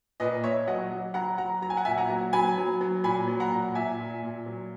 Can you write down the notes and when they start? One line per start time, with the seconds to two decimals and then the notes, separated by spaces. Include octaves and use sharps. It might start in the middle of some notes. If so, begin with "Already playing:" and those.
0.20 A#2 B4 D#5
0.43 A#2 C#5 E5
0.67 F#3 D#5 F#5
0.91 F#3
1.14 F#3 F#5 A#5
1.38 F#3 F#5 A#5
1.62 F#3 A#5
1.70 G#5
1.77 F#5
1.85 A#2 E5 G#5
1.98 F#5 A#5
2.10 F#3
2.33 F#3 G#5 B5
2.57 F#3
2.81 F#3
3.04 A#2 G#5 B5
3.28 F#3
3.40 F#5 A#5
3.52 A#2
3.75 A#2 E5 G#5
3.99 A#2
4.23 A#2
4.46 F#3